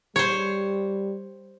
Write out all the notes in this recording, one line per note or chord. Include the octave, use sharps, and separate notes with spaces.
G3 C5 C#5